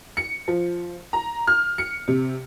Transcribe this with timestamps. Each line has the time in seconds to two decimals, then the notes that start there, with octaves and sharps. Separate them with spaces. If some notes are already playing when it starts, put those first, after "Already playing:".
0.17 C#7
0.48 F3
1.13 A#5
1.47 F6
1.78 C#7
2.08 C3